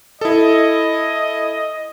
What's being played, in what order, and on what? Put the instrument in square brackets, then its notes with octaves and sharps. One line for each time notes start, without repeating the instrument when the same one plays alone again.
[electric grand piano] E4 A4 [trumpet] D#5